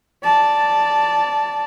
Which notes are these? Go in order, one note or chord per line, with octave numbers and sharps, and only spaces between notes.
D5 A5